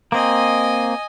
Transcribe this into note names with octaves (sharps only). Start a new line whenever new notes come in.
A#3 C4 D#5 G#5